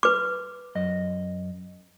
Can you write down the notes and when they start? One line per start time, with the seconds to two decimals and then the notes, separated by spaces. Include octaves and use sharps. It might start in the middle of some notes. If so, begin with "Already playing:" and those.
0.03 B4 D6
0.75 F#2 D#5